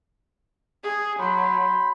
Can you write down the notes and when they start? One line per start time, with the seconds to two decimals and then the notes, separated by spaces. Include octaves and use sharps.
0.84 G#4
1.20 F#3 B5 C6 G6